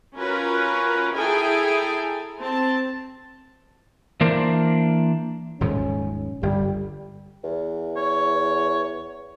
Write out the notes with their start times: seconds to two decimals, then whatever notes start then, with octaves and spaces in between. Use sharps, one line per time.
0.17 C#4 F4 F#4 A#4 B4
1.14 E4 G#4 A4 G5 G#5 A#5
2.38 C4 A5
4.21 E3 A#3 D4 A#4 C5
5.61 D#1 G#2 F3 C#4
6.43 G1 G3
7.44 E2
7.96 C#5